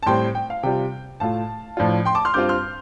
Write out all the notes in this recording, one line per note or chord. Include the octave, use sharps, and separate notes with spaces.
A5
A2 G3 C4 G5 C6
G5
F5
C3 G3 F4 G5
A2 A3 F4 F5 A5
A2 F3 D4 F4
G5 C6
A5 D6
C6 F6
G2 G3 C4 F4 D6 G6
C6 F6